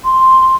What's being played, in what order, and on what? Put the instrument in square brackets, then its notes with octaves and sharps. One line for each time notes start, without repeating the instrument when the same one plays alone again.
[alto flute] C6